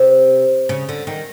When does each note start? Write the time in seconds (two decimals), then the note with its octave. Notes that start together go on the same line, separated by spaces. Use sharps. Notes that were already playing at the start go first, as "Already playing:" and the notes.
Already playing: C3
0.69 C#3
0.89 D3
1.07 D#3